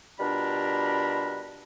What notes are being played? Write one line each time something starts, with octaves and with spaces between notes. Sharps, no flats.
B2 G3 D4 F4 A#4 B5